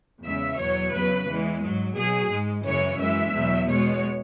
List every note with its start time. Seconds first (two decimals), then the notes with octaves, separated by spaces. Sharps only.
0.23 E2 C#3 G#3 E5
0.58 E2 B2 F#3 C#5
0.93 E2 C#3 F#3 B4
1.27 E2 E3 G#3
1.62 G#2 F#3
1.96 B2 F#3 G#4
2.31 G#2 G#3
2.65 F#2 C#3 E3 G#3 C#5
2.99 F#2 E3 G#3 E5
3.34 E2 B2 F#3
3.68 B2 G#3 C#5